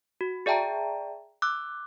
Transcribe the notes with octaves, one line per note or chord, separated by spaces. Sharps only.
F#4
G#4 D5 E5 G5 A5 A#5
D6 E6 F#6